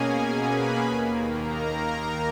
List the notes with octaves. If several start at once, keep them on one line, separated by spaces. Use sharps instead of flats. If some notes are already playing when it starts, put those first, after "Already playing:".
Already playing: B2 A#3 C#4 G#4 G#5
B4 B5
D#2 D#3 A#3
A#4 A#5